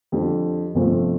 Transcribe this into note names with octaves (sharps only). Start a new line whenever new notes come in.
F2 D3 G3
G1 F2 C3 F3 A3